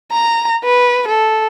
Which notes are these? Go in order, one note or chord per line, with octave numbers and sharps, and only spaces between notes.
A#5
B4
A4